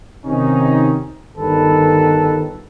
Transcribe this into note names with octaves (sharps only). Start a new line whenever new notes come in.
C3 D#3 C#4 D#4
G1 D#3 A4 B4